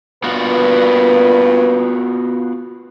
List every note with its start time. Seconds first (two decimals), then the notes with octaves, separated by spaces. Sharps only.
0.24 G2 A#2 B3 F4 F#4 B4